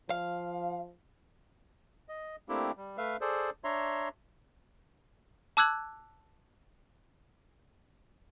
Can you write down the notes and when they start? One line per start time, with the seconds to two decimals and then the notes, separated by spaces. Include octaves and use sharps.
0.10 F3 F5
2.09 D#5
2.49 A3 A#3 C4 D4 E4 G4
2.77 G3
2.97 A3 B4 E5 F5
3.21 G#4 A4 C5 D5
3.64 D4 C#5 E5 A#5 C6
5.57 A5 D6 E6 F#6 G#6 F#7